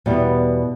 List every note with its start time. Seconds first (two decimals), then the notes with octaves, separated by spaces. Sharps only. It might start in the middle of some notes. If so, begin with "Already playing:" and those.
0.06 E2 B2 G3 B3